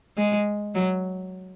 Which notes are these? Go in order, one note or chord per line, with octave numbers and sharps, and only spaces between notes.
G#3
F#3